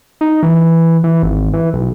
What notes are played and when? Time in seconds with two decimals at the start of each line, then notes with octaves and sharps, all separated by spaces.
0.21 D#4
0.43 E3
1.04 E3
1.23 G#1
1.53 E3
1.73 B1